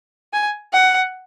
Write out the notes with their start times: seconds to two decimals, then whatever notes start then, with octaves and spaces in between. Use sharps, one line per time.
0.33 G#5
0.73 F#5